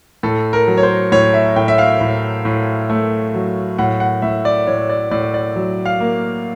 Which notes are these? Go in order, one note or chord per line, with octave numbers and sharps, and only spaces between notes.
A2 A4
A#4
F#3
C#5
C5
A2 C#5
E5
A2 G5
E5
F5
A2
A2
A3
F#3
A2 F#5
F#5
A2 E5
D5
A2 C#5
D5
A2 D5
D5
F#3
F5
A#3